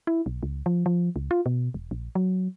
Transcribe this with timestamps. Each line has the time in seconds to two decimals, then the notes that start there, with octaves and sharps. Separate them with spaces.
0.07 E4
0.26 B1
0.43 C#2
0.66 F3
0.86 F3
1.16 C#2
1.31 F4
1.46 B2
1.74 E1
1.91 A#1
2.15 F#3